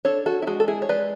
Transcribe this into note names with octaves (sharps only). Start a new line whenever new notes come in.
D4 A4 C#5
F#4 A4
E4
G#3 F#4
A4
E4 G#4
C#5
G#3 B4 D5